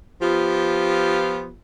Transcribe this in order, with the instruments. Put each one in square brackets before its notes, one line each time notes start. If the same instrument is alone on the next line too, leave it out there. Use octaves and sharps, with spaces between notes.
[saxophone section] F3 B3 F4 G4